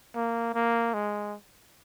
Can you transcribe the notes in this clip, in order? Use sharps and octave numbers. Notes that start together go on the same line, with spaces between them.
A#3
A#3
G#3